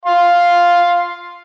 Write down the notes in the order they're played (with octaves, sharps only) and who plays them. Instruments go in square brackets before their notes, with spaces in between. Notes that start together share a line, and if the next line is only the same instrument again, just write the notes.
[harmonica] F5 C6